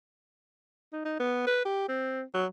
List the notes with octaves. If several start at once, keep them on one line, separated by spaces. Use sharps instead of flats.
D#4
D#4
B3
B4
G4
C4
F#3